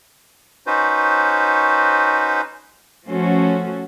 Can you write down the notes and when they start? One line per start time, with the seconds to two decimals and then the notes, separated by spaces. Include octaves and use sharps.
0.67 C#4 D#4 F#4 B4 C5
3.06 F3 A3 C#4 F#4 A4 C5